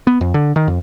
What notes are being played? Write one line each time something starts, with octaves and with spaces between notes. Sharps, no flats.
B3
F2
D3
D#3
F2